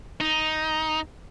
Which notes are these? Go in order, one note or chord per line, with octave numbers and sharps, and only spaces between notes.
D#4